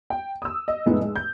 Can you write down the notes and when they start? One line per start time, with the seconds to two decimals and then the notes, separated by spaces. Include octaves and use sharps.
0.10 G5
0.42 D#6 E6
0.68 D#5
0.86 F1 A2 G#3 B3 D#4
1.01 G#3
1.16 G6